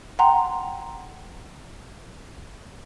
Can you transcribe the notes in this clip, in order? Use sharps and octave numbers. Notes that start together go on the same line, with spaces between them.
F#5 G5 A#5 C6